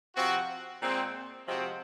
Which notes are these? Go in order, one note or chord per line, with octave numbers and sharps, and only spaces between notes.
C3 F3 C4 F#4
A#2 G#3 C4
C3 F3 G#3 C4 F#4